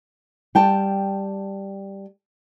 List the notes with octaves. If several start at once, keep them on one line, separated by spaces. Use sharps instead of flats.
G3 G5 A5